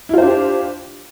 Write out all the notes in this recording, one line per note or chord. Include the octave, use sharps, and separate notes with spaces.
D4 E4 F4 G4 C5